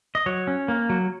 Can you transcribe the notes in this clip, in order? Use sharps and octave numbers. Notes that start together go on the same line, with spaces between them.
D#5
F#3 C#5
C#4
A#3
F#3